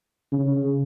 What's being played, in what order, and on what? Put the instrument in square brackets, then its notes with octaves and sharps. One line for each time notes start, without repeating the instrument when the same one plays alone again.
[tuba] C#3